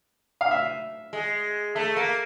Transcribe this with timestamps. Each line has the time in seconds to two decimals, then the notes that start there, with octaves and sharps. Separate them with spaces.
0.41 F5
0.51 E5
1.13 G#3
1.75 A3 E5
1.96 A#3